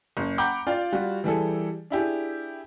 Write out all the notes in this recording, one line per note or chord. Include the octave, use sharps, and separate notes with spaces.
F#1
F#5 G5 A#5 B5 D6 G6
F4 D5 F5 G5
G3 F4 F#4
E3 G3 G#4 A4
D4 E4 G4 G#4